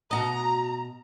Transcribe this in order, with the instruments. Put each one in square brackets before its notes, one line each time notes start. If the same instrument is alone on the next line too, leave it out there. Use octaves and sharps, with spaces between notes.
[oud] B2 F#4 D#5 [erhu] A#5